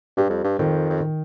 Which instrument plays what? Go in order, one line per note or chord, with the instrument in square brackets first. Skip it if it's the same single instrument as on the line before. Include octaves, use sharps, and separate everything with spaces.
[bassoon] G2 [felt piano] G3
[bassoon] F2
G2
[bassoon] F2 [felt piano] D#3
[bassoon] F2
[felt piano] D#3